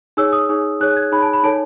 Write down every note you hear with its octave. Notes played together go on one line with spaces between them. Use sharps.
D#4 G#4 C#5 E6
D#6
D#4 G#4 C#5
D#4 G#4 C#5 F#6
G#6
D#4 G#4 C#5 B5
A5
B5
D#4 A4 C#5 A5